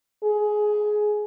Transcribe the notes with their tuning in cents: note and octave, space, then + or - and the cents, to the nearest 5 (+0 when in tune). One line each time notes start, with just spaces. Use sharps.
G#4 +15